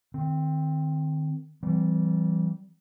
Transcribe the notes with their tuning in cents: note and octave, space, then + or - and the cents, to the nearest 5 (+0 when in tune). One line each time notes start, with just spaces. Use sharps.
D#3 -25 C4 +0
E3 +20 G3 -20 C4 -25